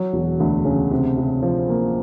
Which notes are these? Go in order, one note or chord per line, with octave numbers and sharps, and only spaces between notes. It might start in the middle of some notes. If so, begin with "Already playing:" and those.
Already playing: F#3
E1
D2
C#3
C3
C3
F3
A#3